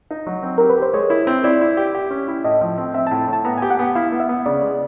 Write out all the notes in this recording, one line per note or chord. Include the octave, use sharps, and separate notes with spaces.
D#4
F#3
C4
G4 A#4
B4
G4
C5
G#3 C#5
E4
C4
E4 D5
E4
G4
G4
C#4
E4
A2 D#5
F3
C4
C4 E5
A5
A2
A2 A5
B3 A#5
G#5
G4
F#5
B3 G5
E4 F5
B3
E5
B3
C#3 D5
G#3